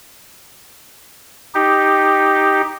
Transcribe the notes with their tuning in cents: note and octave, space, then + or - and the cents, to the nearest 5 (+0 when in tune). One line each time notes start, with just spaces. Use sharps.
D#4 +0 G4 +0